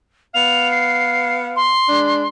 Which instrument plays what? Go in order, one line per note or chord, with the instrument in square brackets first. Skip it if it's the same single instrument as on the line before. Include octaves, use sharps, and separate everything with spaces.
[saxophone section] B3 F5 [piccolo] F7
[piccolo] C7
C6
[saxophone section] G#3 D4